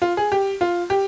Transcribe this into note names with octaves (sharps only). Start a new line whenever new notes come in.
F4
G#4
G4
F4
G4